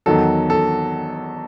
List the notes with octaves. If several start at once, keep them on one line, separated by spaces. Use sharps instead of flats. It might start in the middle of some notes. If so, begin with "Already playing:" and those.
E2 D#3 F#3 A4
A4